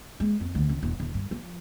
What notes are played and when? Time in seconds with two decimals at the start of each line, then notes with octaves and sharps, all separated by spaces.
0.20 G#3
0.41 F2
0.55 D2
0.69 C#2
0.83 E1
1.00 E1
1.14 G2
1.31 F3